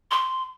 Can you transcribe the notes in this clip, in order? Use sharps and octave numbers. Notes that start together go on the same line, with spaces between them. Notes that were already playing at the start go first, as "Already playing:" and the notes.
C6